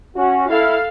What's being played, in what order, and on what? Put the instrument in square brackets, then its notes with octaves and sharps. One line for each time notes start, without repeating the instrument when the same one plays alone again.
[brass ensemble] C#4 F#4
[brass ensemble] E4 [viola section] A4 F5